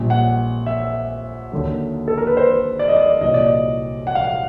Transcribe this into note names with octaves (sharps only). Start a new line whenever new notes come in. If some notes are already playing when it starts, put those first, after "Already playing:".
Already playing: A#1 A#2 G3
F#5
E5
D#2 D3 F#3
A4
A#4
B4
C5
D5
D#5
D5
C2 A#2 F#3 D#5
D5
D#5
F#5
F5
F#5